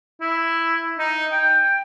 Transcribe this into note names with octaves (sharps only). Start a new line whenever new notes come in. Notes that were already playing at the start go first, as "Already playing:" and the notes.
E4
D#4
G5